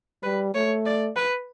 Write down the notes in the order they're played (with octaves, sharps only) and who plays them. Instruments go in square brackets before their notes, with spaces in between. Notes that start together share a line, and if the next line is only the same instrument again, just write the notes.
[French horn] G3 [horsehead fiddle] B4
[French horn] A3 [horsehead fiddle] C#5
[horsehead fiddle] D5
B4